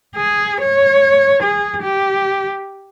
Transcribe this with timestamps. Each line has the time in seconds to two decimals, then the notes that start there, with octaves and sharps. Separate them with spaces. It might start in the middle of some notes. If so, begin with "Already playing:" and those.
0.16 G#4
0.61 C#5
1.43 G#4
1.82 G4